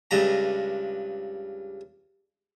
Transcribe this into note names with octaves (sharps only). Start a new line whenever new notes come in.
C#2 G2 A#5